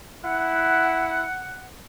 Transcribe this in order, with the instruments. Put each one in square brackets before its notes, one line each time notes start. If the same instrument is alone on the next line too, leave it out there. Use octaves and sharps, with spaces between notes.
[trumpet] E4 [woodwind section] F#5